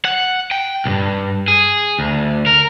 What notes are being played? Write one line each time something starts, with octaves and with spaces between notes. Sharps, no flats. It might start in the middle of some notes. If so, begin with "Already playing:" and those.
F#5
G5
B1 G2
G#4
D2
A#4